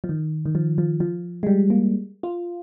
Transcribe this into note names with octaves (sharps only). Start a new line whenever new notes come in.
F3
D#3
D#3
F3
F3
F3
G#3
G3
A#3
F4